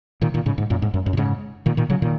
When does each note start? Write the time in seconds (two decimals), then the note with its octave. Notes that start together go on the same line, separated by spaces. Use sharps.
0.22 A#2 D#3
0.34 A#2 D#3
0.46 G#2 C#3
0.58 G#2
0.70 F#2 A#2
0.82 G#2
0.94 F#2
1.06 F#2
1.13 A#2
1.17 G#2 C#3
1.66 A#2 D#3
1.77 A#2 D#3
1.90 C#3 F#3
2.02 A#2 D#3